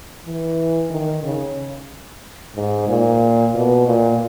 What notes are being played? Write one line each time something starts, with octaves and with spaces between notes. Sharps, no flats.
E3
D#3
C#3
G#2
A#2
B2
A#2